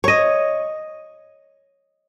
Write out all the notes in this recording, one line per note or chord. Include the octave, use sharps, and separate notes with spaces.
C#5 D#5